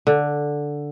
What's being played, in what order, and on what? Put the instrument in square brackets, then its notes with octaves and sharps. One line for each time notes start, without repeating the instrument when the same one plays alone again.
[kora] D3